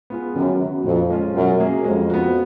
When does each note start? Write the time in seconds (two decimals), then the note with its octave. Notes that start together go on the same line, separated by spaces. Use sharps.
0.10 B3 F4 G#4
0.35 F#2 D#3
0.60 F#3 B3 F#4
0.85 F2 A#2
1.10 F3 G#3 C#4 F4
1.34 F#2 B2
1.60 F#3 A#3 C#4 G#4
1.84 F2 G#3
2.10 B3 F#4